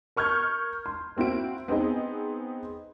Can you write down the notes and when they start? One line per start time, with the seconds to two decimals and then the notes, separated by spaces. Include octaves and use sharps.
0.16 A#4 C#6 F6 G6 G#6
0.86 C6
1.17 A#3 C4 E4 F#4 D7
1.68 B3 C4 D#4 G#4 D#5